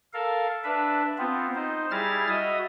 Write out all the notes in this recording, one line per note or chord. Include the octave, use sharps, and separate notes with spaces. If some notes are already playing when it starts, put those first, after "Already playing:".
A4 A#4 F5
D4 B4 E5
B3 C4 F4
D#4 C5
G3 E4 G#4 A#5 F6 A6
F#4 D#5 E5 D#6